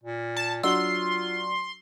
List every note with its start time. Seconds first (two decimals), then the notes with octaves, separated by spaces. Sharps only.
0.03 A#2
0.36 A5
0.63 F#3 D4 F4 F#4 C6 E6